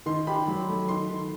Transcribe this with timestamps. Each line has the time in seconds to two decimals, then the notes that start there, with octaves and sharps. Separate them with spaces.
0.06 D#3 C6
0.27 G4 B5
0.48 F#3
0.68 A3
0.89 D#3 C6
1.09 D#3